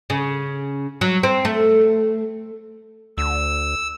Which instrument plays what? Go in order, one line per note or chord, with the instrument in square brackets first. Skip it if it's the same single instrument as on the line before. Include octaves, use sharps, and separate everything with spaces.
[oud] C#3
F#3
C4
A3
[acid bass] D2 [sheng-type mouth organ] E6